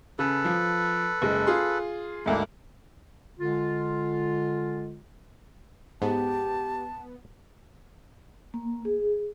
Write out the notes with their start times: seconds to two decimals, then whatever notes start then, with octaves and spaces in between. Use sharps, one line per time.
0.19 C#3 A4 B4
0.45 F3
1.22 F#1 G#3
1.47 F4 G#4 C6
2.26 D2 G#2 A#3 D4 E4
3.40 D3 G#3 F4
6.02 G#2 B3 G4 A5
8.54 A#3
8.85 G#4